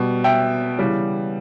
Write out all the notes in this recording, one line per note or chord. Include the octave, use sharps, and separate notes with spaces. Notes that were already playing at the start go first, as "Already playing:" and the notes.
Already playing: B2 G3
E5 G5
C#3 E3 G3